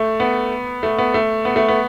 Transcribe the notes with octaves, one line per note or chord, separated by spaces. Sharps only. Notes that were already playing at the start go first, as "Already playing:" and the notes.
Already playing: A3
B3
A3
B3
A3
B3
A3
B3